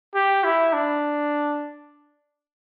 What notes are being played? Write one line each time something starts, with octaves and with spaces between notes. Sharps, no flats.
G4
E4
D4